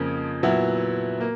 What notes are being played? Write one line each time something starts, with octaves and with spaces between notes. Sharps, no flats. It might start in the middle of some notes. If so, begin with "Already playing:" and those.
Already playing: F2 C#3 F3 A#3
A#2 F#3 B3 E4
A#3